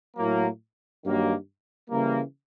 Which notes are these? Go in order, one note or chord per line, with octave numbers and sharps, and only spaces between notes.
A2 F#3 A#3
G2 D#3 F#3 A#3
C#3 E3 G3 A#3